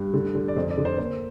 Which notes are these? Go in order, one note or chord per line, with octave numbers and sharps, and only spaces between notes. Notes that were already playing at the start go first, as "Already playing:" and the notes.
Already playing: G2
D3
D3
D5
F2 C5
D5
D3
C5
A#3 C5